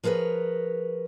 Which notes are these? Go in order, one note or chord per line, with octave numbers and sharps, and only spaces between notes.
F3 G#4 A#4 B4 C#5